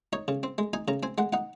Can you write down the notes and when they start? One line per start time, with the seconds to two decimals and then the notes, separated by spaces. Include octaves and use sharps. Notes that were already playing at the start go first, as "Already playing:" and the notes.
0.13 D#4 C#5
0.28 C#3
0.43 C4
0.58 G#3
0.73 D#4 G#5
0.88 C#3 A#5
1.03 C4 G#5
1.18 G#3 F#5
1.33 D#4 F#5